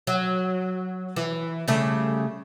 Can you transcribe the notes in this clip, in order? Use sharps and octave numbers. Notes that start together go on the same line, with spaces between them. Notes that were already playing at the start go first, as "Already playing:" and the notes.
F#3
E3
C#3 G3 A3